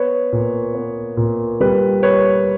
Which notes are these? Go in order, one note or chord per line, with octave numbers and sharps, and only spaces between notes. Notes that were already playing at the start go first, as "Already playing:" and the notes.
Already playing: B3 B4 C#5
A#2
B3
A#2
G3 B4
B4 C#5